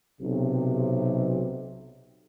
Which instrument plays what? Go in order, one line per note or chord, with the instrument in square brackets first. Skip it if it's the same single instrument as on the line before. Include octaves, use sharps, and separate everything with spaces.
[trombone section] B1 C3